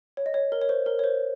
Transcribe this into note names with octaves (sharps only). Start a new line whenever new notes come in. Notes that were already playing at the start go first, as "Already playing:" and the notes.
C#5
D#5
C#5
A#4
C#5
C5
A#4
C#5
C5